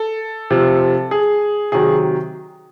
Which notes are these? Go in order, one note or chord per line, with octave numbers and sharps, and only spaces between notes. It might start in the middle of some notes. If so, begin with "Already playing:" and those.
Already playing: A4
C3 F3
G#4
C3 D#3 F#3 G#4